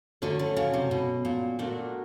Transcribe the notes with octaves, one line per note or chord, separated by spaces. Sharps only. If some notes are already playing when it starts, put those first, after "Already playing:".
D3 F#3 A3 C#4
D3
C#3
C3
B2
A#2
A#2 A3 D4 F#4 A#4